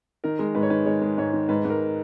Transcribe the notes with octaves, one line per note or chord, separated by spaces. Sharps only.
D#3 A#4
G#3
G#2 B4
C#5
D#3 B4
G#3 C#5
G#3
G#2 C#5
D#3
G#2 B4
G#2
A#4